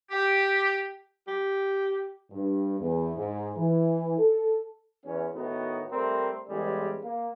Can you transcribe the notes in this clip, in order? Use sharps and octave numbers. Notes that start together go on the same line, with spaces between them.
G4
G4
G2
E2
G#2
E3
A4
E2 C#4
A2 D#3 B3 D#4 F#4
G3 A3 C4 A#4 C5
A1 E2 G3 G#3
A#3